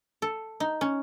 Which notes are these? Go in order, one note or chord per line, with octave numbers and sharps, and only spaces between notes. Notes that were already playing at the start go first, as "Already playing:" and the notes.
A4
D#4
C#4